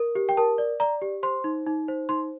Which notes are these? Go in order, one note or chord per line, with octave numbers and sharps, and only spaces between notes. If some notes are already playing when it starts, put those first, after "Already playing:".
Already playing: A#4
G4
G5
A#4 A5
D5
D5 A#5
G4
C5 C6
D#4
D#4
C5
D#4 C6